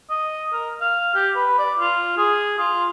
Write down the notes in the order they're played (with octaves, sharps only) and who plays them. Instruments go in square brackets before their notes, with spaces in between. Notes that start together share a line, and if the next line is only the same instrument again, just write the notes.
[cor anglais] D#5
A#4
F5
G4
B4
D5
F4
G#4
F4